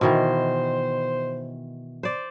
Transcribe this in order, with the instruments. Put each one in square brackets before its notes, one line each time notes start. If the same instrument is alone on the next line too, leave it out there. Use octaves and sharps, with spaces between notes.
[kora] B2 D#3 E3 [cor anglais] C5
[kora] C5 D5